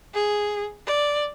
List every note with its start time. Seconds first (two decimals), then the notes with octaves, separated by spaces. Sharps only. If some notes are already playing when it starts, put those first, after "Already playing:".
0.14 G#4
0.87 D5